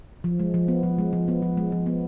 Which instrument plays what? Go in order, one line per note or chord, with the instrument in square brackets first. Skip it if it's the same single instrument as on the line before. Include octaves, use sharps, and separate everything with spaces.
[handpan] F3
G#3
F3
B3
F3
G#3
F3
B3
F3
G#3
F3
B3